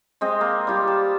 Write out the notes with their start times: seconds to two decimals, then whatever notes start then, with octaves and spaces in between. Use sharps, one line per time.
0.21 G#3 C4 D#5
0.41 A#3
0.67 G3 F4 G4
0.88 A5